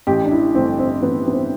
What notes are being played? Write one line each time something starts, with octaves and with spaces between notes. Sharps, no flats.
A1 G4
D4
E4
G2 D3 A3 C4
C4
A1 B3
B3
C4